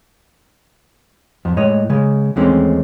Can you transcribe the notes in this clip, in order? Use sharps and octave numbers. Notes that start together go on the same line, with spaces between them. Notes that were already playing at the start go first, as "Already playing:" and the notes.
F2
A2 G#3 C#5 D#5
C#3 G#3
D#2 E3 G#3 A3 C4 C#4